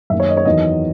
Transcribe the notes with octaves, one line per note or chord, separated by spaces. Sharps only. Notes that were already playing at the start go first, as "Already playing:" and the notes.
F#2 D#3 A#3 E5
C#5
D#5
C#5
E2 D#3 F#3 D#5